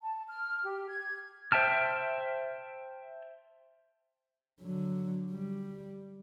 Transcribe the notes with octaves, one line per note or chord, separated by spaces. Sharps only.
A5
F6
G4
G#6
C5 E5 G5 A5 F6
D3 F#3
G3